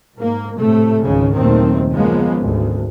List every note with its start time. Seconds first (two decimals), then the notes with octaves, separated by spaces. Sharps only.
0.16 G#2 A#3
0.58 A2 C3 A3
1.02 G#1 C#2 C#3
1.34 F#1 D#2 A#2 D#3 A3 C4
1.91 C#3 F3 G#3 A#3 B3
2.41 G#1 D2